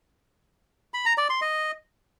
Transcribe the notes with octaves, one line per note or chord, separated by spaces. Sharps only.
B5
A#5
D5
C6
D#5